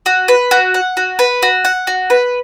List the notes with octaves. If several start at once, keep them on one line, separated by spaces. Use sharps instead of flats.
F#4
B4
F#4
F#5
F#4
B4
F#4
F#5
F#4
B4